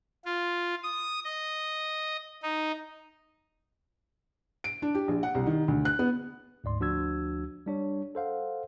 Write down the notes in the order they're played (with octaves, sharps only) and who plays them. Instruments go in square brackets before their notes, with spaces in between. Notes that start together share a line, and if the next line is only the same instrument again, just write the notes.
[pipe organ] F4
D#6
D#5
D#4
[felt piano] D7
D4
G4
A#1
F#5
C2
D#3
D2
F#6
B3
[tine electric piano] D2 G#2 D5 C6
D2 F3 D4 F#4 E6 G#6
G3 D4 C#5
A4 C5 F5 F#5